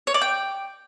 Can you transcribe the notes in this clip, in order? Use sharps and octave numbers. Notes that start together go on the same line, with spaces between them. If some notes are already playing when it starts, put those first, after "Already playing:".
C#5
D5
G5